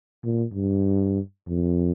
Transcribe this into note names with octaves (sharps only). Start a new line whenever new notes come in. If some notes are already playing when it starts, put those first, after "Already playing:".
A#2
G2
F2